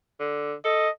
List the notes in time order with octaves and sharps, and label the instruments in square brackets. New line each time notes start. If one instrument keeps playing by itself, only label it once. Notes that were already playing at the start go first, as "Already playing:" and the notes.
[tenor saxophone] D3
[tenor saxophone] A4 [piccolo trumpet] D#5